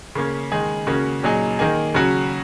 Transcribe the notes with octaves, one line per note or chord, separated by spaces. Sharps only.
C#3 A#3 C#4
D#3 G#3 D#4 G#4
C#3 A#3 C#4 F#4
A#2 F#3 D#4 G#4
D#3 A#3 D#4 G#4
C#3 F#3 C#4 F#4